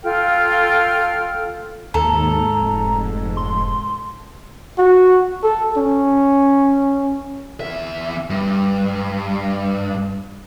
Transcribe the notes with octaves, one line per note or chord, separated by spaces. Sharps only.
F4 A4 G5 F6
D#2 G#2 A4 A#5
F1
C6
F#4
A4
C#4
E2 E5
G2